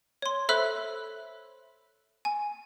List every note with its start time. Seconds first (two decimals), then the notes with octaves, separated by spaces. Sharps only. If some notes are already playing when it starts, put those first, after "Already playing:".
0.22 C#5 C6
0.49 A4 C5 E5 B5 E6 F#6
2.25 G#5